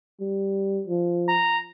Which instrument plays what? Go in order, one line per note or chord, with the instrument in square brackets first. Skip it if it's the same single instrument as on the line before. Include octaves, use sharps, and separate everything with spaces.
[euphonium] G3
F3
[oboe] A#5